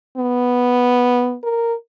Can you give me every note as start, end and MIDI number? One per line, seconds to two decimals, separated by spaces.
0.17 1.36 59
1.43 1.73 70